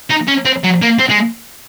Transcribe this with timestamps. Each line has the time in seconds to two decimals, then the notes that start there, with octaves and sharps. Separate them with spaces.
0.10 D#4
0.27 C#4
0.45 C4
0.64 F#3
0.81 A#3
0.99 C4
1.09 G#3